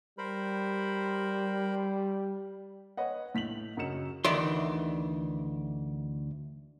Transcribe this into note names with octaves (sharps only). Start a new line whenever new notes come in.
G3 A#4 C5 B5
B4 C#5 D#5 F#5
A2 B6 F7 F#7
F#2 C#3 F#3 D#5 C#7 E7
D2 D#3 E3 D5 C6